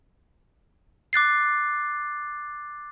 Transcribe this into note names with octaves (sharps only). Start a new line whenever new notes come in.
D6 F#6 A6 C7